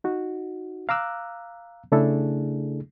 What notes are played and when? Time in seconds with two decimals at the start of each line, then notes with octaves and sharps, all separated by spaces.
0.04 D#4 F#4
0.89 F5 A#5 D6 E6 F#6
1.92 C#3 A3 D4 E4 G#4 A4